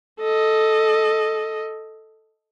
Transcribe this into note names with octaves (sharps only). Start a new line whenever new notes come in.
A4 D#5